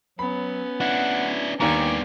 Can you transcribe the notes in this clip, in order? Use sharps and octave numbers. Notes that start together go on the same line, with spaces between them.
F#3 B3 C#4 B5
D4 E4 F#5
D#2 D#3 B3 D4 G#5 A#5 C#6 D6